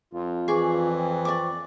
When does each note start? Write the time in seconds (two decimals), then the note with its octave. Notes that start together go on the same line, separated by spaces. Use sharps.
0.14 F2 F4
0.48 E3 G#4 D5 C#6
0.95 C4
1.25 D5 C#6 D6